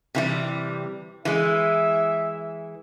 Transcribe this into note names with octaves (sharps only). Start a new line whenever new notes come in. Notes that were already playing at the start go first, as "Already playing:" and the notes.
C3 E3 G3
E3 G#3 E5